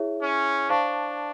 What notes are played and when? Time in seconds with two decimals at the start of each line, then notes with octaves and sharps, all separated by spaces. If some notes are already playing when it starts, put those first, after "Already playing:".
Already playing: E4 G#4 C#5 E5
0.22 C#4
0.69 D4 C5 F5 A5 C#6